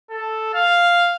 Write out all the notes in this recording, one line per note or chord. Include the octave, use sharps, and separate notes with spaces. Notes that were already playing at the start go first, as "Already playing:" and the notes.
A4
F5